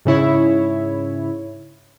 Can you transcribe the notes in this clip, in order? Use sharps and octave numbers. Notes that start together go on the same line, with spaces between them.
G#2 C#3 E4 C#5